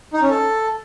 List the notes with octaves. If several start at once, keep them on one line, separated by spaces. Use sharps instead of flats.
D#4
C#4
A4